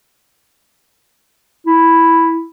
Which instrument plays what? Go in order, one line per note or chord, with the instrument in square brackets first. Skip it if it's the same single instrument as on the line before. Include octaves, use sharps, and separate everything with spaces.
[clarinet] E4